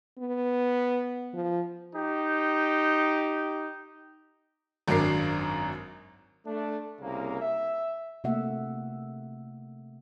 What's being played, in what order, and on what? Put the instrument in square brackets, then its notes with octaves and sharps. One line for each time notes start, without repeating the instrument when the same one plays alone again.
[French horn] B3
F3
[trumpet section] D#4 G4
[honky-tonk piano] G#1 F#2 D4 A#4 C7
[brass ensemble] A3 D4
C2 C#3 A#3
E5
[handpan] C3 A3 A#3 E5 F#5